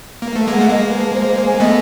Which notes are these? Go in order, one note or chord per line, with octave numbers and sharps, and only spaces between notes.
A#3 B4
A3 A5
G#3 A#3
F#5
A3
G#3 A#3 D#5
B4
A5
C5
C5
G#5
A3 B3 D#5